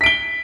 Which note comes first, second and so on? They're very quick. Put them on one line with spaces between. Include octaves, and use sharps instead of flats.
B6 D7 G7